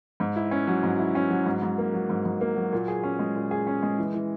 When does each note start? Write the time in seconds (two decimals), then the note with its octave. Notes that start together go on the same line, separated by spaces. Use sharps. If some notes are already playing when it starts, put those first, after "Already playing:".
0.20 G#2
0.36 E4
0.51 C#4
0.67 F#3
0.83 G#2
0.99 E4
1.15 C#4
1.30 F#3
1.46 G#2
1.62 G#2
1.78 A#3
1.93 F#3
2.09 G#2
2.25 G#2
2.41 A#3
2.56 F#3
2.72 A#2
2.88 G#4
3.03 C#4
3.19 G#3
3.35 A#2
3.51 G#4
3.67 C#4
3.83 G#3
3.98 E3
4.14 E3